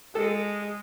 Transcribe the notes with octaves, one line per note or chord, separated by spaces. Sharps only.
G#3 A4